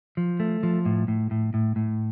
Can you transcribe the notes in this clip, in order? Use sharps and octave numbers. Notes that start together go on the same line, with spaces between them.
F3
A3
F3
A2
A2
A2
A2
A2